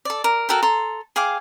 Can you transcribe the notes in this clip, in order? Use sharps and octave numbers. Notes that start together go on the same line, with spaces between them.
A4 D5
A#4
F#4 A4 A#4 G5
A4 A#5 C6
G#4 F5 G5 D6